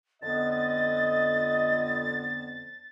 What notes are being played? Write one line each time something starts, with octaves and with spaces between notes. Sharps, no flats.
F2 D3 B3 D#5 A6